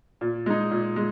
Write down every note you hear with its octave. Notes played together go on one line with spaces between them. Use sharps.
A#2
G#3 D#4
A#2
G#3